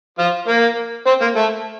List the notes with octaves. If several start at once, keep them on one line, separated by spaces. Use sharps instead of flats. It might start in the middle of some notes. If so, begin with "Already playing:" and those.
F3 F4
A#3 A#4
C4 C5
A#3 A#4
A3 A4